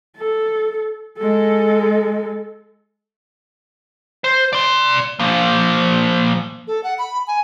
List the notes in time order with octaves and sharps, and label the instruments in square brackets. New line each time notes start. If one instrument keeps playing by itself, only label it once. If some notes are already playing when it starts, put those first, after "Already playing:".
[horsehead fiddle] A4
G#3 A4
[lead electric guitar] C5
D5 C6
F3 A#3
[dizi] A4
F#5
B5
G#5